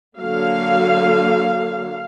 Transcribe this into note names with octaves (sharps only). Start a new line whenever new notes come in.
D3 F#3 A#3 F5